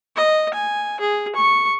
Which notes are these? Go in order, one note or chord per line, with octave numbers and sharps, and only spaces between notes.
D#5
G#5
G#4
C#6